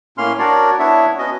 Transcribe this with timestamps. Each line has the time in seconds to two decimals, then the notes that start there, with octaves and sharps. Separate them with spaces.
0.18 A2 A#3 C#4 C6 F6
0.39 D4 F#4 A#4 C#5 D5
0.79 B3 D4 E4 C#5 E5
1.19 B3 C#4 F#4 D#5